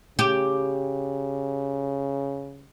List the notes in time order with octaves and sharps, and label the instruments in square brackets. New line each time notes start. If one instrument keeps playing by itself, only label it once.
[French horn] C#3 [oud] G4